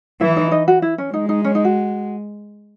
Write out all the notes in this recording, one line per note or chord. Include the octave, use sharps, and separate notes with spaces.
E3 E4 E5
D#4 D#5
D#4 D#5
F#4
E4
C#4
G#3 D#4
D#4
C#4
D#4
F#4